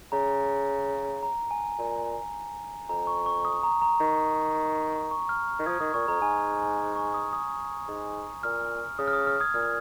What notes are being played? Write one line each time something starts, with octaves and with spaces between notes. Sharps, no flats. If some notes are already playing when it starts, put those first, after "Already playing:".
C#3 A#5
A#5
G#5
A#2
F2 A#5
C#6
C#6
D#6
A#5
A#5
D#3
C#6
F6
D#3
F3 D#6 G#6
D#3 D#6
A#2 C#6
F2 A#5
G#2 G#5
C#6
D#6
D#6
G#2
A#2 F6
C#3 D#6
F6
D#6
F6
D#6 G#6
A#2 F6